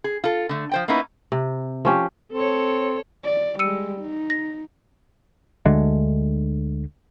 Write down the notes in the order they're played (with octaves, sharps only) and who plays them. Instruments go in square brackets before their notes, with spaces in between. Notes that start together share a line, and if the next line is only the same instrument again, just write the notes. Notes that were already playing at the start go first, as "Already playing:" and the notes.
[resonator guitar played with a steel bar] G#4
F4 A4
D3 A3
F3 C5 G5
A#3 B3 C#4 D#4 E4 B4
[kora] C3
F3 C#4 G4
[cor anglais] C4 [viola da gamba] A4 C#5
[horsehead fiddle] D5
[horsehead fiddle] G3 G#3 [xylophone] E6 C#7 D#7
[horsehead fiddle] D#4
[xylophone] A#6
[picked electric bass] D2 D3 G#3 A3